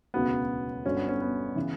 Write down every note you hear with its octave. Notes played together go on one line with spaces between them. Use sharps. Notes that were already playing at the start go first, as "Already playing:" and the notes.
E1 D2 C#3 F#3 B3
G1 G2 D3 F#3 C#4
B3
C#4
B3
C#3 E3